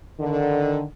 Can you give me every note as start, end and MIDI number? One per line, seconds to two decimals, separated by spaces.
0.20 0.82 50
0.20 0.82 51